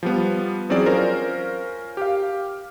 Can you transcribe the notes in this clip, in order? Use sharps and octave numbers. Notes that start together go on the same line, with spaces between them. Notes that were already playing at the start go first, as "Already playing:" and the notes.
F3 G3 B3
E3 F#3 C4 C#4 G#4 D5
C#4 F4 A#4 C5
G4 F5